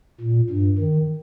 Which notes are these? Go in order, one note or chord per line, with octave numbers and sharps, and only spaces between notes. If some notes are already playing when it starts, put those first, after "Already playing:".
A#2
G2
D#3